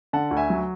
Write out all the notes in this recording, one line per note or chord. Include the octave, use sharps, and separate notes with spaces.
D3 F#5 A5
D2
E5 G#5
F#3